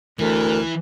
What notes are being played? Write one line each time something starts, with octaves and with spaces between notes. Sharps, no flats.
D2 E3 A#4